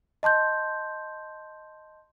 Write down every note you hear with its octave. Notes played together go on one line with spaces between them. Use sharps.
D#5 A5 C6 G6